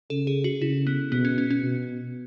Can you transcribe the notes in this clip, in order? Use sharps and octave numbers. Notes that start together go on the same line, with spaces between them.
C#3 A4
G#4
F#4
C#3 E4
B3
B2 B3
C#4
C#4
C#4
B2